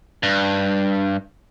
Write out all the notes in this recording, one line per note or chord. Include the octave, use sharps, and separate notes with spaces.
G2